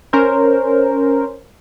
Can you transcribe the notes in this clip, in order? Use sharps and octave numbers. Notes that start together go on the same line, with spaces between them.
C#4 A#4 C5